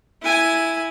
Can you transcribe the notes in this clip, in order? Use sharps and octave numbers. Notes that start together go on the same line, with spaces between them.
E4 G#5